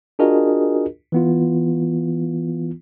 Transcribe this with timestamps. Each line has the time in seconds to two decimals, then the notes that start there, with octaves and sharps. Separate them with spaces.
0.19 D4 F4 F#4 G#4 A#4 D#5
1.12 E3 B3 F4